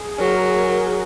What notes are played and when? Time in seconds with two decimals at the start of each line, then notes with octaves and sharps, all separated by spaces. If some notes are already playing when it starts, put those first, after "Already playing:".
Already playing: G#4
0.19 F#3 A#4